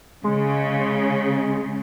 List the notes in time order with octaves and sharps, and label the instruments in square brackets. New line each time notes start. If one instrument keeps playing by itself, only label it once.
[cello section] C#3 [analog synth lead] G#3